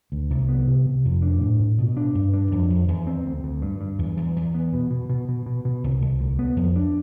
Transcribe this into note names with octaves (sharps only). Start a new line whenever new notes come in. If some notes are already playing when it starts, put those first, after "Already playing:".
D2
C2
B3
C3
C3
F2
D4
A2
A2
B2
D4
G2
D4
F2
F2
E2
C4
D2
D2
G2
G2
E2
E2
E2
B3
B2
B2
B2
B2
B2
B2
C2
C2
D2
B3
F2
D4